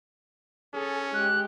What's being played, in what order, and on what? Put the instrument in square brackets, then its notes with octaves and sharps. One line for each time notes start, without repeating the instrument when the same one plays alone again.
[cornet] C#4 [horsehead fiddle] G#4 A4
[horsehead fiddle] G#3 G4 [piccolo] F#6